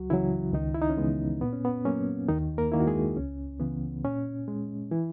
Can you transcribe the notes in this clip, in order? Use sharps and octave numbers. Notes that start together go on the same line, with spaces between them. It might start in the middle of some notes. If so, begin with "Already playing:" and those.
Already playing: C#2 F#3 F#4
C#3 E3 F#3 E4
C#2 D#3 D#4
E4
D#4
C#4
C#3 E3 G#3 B3
A#2 B3
C#4
B3
F#3 A#3 C#4
D#2 D#3 D#4
A#3 A#4
D#3 A#3 E4
F#4
G#3 G#4
C#2 C#4
C#3 E3 B3
A#2 C#4
G#3
E3 E4